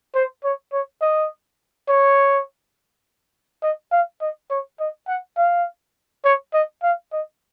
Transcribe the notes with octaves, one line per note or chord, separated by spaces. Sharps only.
C5
C#5
C#5
D#5
C#5
D#5
F5
D#5
C#5
D#5
F#5
F5
C#5
D#5
F5
D#5